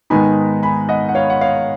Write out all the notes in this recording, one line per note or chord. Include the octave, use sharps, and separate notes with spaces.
G#2 D#3 G#3 B3 D#4 G#5 B5
G#5 B5
D#5 F#5
F#5
C#5 F5
F#5
C#5 F5